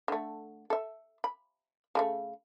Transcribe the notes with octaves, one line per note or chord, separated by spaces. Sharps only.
D3 A3
A4 E5
B5
C#3 F3 A3